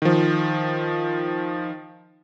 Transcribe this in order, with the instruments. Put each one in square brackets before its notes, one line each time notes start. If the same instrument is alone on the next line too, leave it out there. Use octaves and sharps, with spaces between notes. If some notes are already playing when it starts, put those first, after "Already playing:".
[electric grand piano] D#3 F3